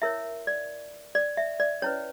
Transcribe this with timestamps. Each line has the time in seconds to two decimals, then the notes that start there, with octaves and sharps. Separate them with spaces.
0.02 E4 A#4 C#5 E5
0.47 D5
1.15 D5
1.37 E5
1.60 D5
1.82 C#4 E4 B4 C#5